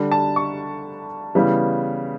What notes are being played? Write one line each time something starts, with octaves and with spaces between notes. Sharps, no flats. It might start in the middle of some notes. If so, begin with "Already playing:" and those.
Already playing: D3 G3 D4
A5
C#6
C#3 E3 G3 B3